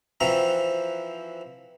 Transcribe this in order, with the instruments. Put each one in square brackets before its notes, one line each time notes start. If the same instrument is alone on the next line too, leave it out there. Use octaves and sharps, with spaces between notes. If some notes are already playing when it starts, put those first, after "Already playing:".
[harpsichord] E3 F3 C4 F#4 E5 A#5